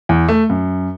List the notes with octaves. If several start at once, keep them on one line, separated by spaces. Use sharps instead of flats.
E2
A3
F#2